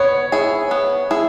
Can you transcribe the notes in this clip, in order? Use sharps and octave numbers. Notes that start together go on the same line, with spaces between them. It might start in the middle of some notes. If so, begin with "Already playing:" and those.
Already playing: B3 C#5
E4 G#4
B3
E4 G#4